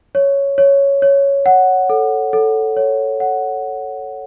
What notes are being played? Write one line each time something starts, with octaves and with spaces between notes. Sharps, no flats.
C#5
C#5
C#5
F#5
A4
A4
C#5
F#5